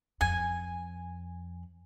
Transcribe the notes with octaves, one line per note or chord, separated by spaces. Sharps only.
F2 G#5